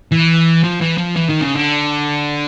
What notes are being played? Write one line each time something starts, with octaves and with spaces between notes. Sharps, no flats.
E3
F3
E3
F3
E3
D#3
C#3
D3